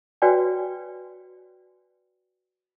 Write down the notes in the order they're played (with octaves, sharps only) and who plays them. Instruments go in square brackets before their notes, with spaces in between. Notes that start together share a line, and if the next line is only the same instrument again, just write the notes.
[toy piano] F#4 B4 C#5 D5 G5 G#5